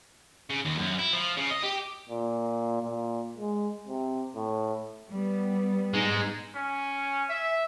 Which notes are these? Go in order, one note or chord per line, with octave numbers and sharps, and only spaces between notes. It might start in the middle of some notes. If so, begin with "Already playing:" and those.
C#3
D#2
F#2
E4
F3
C#3
D#5
G4
A#2
A#2
G#3
C3
A2
G3 B3
G#3 D#4
C#4
E5